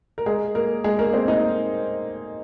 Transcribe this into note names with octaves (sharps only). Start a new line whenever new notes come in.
A#4
G#3 G#4
A#3 A#4
G#3 G#4
A#3 A#4
C4 C5
D#4 D#5